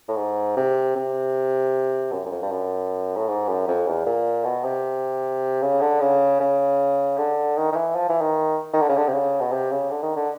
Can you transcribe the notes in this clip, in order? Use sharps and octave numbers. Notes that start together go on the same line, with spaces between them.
A2
G#2
C3
C3
F#2
F#2
F2
G2
F#2
A2
G#2
F#2
F2
E2
A#2
B2
C3
C#3
D3
C#3
C#3
D3
D#3
D#3
E3
F3
E3
D#3
D#3
D3
C#3
D3
C3
C#3
B2
C3
C#3
D3
D#3
D3